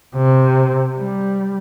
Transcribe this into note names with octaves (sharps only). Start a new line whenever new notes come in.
C3
G3